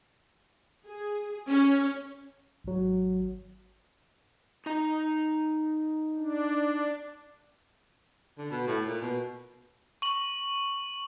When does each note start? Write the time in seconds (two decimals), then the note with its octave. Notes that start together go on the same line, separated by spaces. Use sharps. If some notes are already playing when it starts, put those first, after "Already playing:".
0.87 G#4
1.48 C#4
2.64 G#1 F#3
4.66 D#4 A#5
6.18 D4
8.38 D3
8.51 B2
8.67 A2
8.87 A#2
9.01 B2
10.02 C#6 F#7